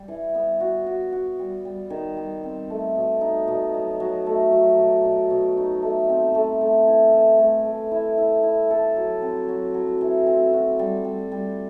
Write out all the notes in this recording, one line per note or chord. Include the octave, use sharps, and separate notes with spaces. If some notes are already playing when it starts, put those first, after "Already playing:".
Already playing: G3
E3
B3
F#4
F#4
F#4
G3
G3
D#3
G3
C4
A3
B2
D#4
B2
F#3
F#3
A3
F#3
B2
B2
B2
D#4
A3
C4
A3
A3
E3
E3
A3
A3
E4
E4
E4
A4
F#3
C4
F#3
F#3
E3
C4
F#4
G3
G3
G3